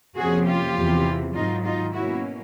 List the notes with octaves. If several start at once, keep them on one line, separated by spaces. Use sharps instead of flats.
F2 C3 F3 A#3 C#4 F#4 G#4
F4 G4
E2 C3 E3
G#2 D#3 F#3 D#4 F4
D#4 F4
B2 F#3 A#3 C#4 E4 F#4